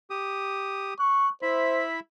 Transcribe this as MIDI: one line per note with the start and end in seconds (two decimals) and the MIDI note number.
0.10 0.94 67
0.10 0.94 87
0.99 1.30 85
0.99 1.30 90
1.42 2.00 64
1.42 1.84 72
1.42 2.00 76
1.42 2.00 83